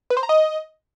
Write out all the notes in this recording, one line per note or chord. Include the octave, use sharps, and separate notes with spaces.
B4
C5
A#5
D#5